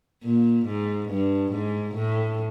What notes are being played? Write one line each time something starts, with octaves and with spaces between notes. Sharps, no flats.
A#2
G#2
G2
G#2
A2